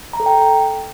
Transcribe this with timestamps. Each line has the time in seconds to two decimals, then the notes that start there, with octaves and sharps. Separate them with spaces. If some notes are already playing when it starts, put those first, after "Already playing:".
0.13 A#5
0.20 A4
0.26 G5